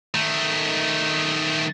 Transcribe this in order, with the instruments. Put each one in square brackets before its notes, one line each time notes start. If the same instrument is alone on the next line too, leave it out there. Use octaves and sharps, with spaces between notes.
[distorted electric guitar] D#3 A3